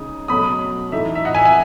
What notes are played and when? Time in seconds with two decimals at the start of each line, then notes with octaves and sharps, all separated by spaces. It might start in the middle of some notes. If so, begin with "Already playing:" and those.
Already playing: C#3 G#3 D#4 D#6
0.28 B2 F#3 A3 B5 D#6
0.92 E3 A3 D#4 E5
1.15 E5
1.25 D#5 F#5
1.35 E5 G#5
1.45 E5 G#5